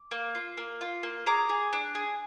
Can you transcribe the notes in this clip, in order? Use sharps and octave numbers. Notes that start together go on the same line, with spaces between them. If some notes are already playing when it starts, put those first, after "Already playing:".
Already playing: D6
A#3
F4
A#3
F4
A#3
G#4 A#5 D6
G#4
D4
G#4